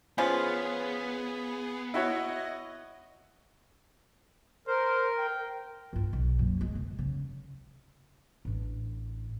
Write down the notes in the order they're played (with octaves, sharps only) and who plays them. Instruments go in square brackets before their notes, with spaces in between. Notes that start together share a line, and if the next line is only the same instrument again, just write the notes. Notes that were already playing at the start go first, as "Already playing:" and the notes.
[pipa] F3 C#4 F4 [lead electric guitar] B3 [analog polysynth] G#4
[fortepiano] E4 F#4 C#5 [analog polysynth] D#5
[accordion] A#4 [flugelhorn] C5
[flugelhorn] G5
[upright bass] G2 F4
B1
F#2 A#2
G#3
D3
C#3
A1 D4